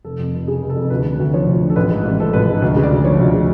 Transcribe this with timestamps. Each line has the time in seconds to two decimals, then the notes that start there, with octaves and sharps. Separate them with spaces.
0.05 F1 A4
0.19 F2
0.34 F1
0.48 C#3 G#4
0.62 F1
0.69 A4
0.76 F2
0.90 D2 B4
1.05 D3
1.19 D2
1.34 F3 C#5
1.47 D2
1.63 D3
1.70 A4
1.76 A1 B4
1.91 G#2
2.05 A1
2.19 F3 A4
2.33 A1 B4
2.48 G#2
2.62 D2
2.76 C#3
2.83 D5
2.91 D2
3.05 F3 C#5
3.20 D2
3.34 C#3